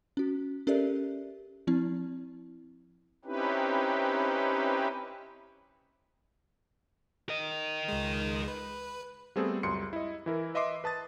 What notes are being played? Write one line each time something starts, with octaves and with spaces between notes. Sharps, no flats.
C#4 F#4
C#4 G4 A4 A#4 D5 E5
F3 C4 E4
C4 C#4 D#4 E4 G4 B4
A#4 D#5
C#2 G#3
B4
G3 A3 B3 C4 G#4 A4
C#2 F#2 G3 C6 C#7
E4 D#5
E3 E4 A#4
B4 D#5 E5 C6 D6 C7
B4 A5 D#6 A6